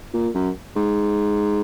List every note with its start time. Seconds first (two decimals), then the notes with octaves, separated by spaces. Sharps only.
0.14 A#2
0.35 F#2
0.76 G#2